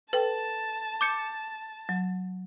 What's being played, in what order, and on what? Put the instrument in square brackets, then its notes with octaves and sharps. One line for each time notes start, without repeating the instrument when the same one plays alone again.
[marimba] A4 G5 [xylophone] B4 [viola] A5
[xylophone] D6 G6 C#7
[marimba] F#3